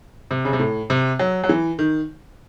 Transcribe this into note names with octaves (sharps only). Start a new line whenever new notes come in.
C3
C#3
C3
A2
C3
F#3
F#3
E3
D#3